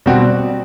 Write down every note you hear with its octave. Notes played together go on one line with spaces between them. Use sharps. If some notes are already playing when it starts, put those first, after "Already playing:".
B2 G3 C4 F#4